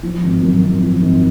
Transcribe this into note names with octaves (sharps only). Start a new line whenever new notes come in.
F3
G#1
F#2
G#1
F3
G#1